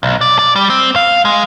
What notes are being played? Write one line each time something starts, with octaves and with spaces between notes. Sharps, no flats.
B1
D5
D5
G3
C4
F5
G#3